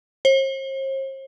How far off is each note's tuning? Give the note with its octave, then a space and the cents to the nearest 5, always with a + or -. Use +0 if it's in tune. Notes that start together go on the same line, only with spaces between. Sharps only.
C5 +45